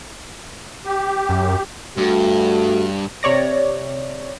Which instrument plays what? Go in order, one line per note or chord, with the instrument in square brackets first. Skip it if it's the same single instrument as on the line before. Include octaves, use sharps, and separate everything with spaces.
[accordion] G4
[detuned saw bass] F#2
[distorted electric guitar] G2 [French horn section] A3 F#4
[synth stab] C3 C#5 D5 A#6